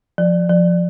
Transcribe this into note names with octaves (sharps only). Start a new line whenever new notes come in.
F3
F3